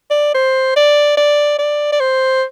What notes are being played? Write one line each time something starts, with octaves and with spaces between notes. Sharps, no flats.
D5
C5
D5
D5
D5
D5
C5